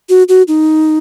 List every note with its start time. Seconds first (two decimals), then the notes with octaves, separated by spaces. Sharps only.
0.09 F#4
0.29 F#4
0.48 D#4